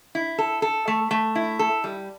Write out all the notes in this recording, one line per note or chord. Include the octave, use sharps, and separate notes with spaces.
E4
A4
A4
A3
A3
E4
A4
G3